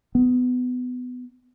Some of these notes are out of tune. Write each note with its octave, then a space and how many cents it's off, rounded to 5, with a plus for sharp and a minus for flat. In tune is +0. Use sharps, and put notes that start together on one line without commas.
B3 +20